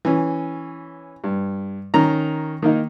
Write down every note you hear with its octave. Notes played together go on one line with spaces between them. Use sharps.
E3 C#4
G2
D#3 C#4 A#5
D#3 A#3 D#4